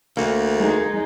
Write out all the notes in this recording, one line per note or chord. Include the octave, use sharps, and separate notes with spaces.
D2 A#3
G#3 D#4